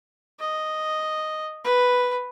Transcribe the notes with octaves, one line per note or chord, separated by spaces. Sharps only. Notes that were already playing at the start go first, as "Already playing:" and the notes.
D#5
B4